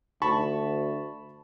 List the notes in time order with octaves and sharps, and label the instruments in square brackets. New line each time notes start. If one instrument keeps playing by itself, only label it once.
[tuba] D2 [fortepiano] A5 B5 C#6